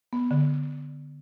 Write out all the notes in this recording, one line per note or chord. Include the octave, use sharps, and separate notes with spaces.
B3
D3